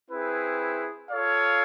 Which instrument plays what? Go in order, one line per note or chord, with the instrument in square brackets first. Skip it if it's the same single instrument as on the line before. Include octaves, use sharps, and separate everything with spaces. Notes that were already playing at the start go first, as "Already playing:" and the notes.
[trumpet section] C4 E4 G#4 B4
F4 A4 C#5 F5